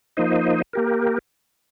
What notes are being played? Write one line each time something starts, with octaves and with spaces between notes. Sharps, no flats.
F3 A#3 D#4 C5 D#5
A#3 G4 A#4